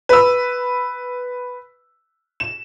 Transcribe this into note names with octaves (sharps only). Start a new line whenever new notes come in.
B4 E6
E7